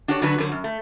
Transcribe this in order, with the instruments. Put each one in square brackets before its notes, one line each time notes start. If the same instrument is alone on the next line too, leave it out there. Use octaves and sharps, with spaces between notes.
[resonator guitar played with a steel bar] D4 F#4 G4 A4 C#5
D3 F#3 D4 F#4 B4
D3 F#3 B4 C5
F#2
A3